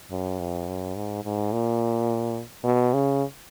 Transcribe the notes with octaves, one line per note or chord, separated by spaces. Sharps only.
F#2
F2
F#2
G#2
G#2
A#2
B2
C#3